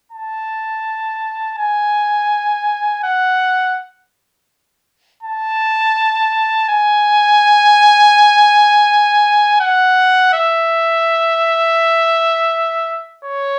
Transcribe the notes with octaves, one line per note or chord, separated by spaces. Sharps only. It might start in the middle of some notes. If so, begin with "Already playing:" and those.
A5
G#5
F#5
A5
G#5
F#5
E5
C#5